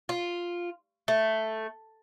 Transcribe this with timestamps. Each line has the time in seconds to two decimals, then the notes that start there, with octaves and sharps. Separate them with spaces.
0.09 F4
1.08 A3